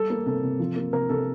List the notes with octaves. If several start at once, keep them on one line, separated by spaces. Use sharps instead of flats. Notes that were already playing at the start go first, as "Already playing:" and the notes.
Already playing: G3 A4
A#3
C3 A4
C3
F3
A#3
C3 A#4
C3 A4